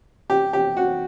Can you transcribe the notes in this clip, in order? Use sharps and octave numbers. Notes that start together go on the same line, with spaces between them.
G4
G4
F#4